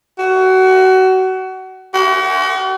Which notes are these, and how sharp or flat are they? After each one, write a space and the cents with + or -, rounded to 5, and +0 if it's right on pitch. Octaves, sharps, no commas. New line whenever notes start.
F#4 +25
F#4 +45